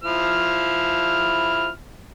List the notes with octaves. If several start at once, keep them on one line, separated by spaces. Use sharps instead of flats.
F3 E4 F6